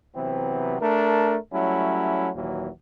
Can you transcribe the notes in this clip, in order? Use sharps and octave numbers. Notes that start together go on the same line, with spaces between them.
C3 E3 F#3 B3 C4
A3 D4 A#4
F#3 G3 A3 C#4 E4
D#2 A#2 E3 F#3